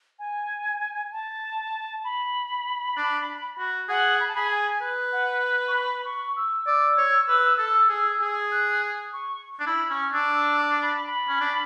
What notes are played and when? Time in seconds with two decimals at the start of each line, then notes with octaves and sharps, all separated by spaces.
0.19 G#5
1.12 A5
2.04 B5
2.97 D4
3.58 F#4
3.89 G#4 F#5
4.20 B5
4.28 A5
4.35 G#4 B5
4.51 G#5
4.81 B4
5.12 F#5
5.68 C#6
5.74 B5
6.05 C#6
6.36 E6
6.66 D5 E6
6.98 C#5
7.29 B4
7.58 A4
7.89 G#4
8.21 G#4
8.52 F#6
9.13 C#6
9.60 D4
9.67 E4 B5
9.90 C#4 C#6
10.13 D4 E6
10.36 E6
10.60 D6
10.82 B5
11.06 B5
11.29 C#4
11.40 D4